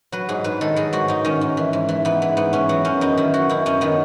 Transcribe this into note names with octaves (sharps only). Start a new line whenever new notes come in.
F#3 B4
G#2 G#4
G#2 B4
D#3 A4
F#3 G#4
G#2 F#4
G#2 D#4
D#3 C#4
G#2
E3
G#2
E3
G#2 B3
E3
G#2 B3
E3 C#4
F#3 B3
F#2 C#4
F#2 D#4
D#3 E4
F#3 F#4
F#2 E4
F#2 C#4
D#3 B3